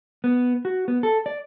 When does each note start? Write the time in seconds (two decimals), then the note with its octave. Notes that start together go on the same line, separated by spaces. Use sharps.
0.24 B3
0.65 F#4
0.88 B3
1.03 A4
1.26 D5